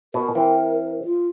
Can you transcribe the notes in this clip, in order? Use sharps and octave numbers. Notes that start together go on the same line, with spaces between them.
B2 A#4
E3 C4
F4